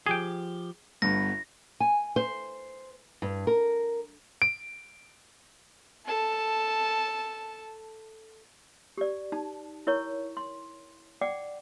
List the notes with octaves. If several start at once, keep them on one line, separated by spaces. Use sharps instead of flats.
F3 G4 G#4 G5
G1 G2 B3 A#6
G#5
C5
G2
A#4
D7
A4 A5
G4 D5
D#4 A5
E4 A#4 C#5 C#6
C6
D5 F#5 G5 D6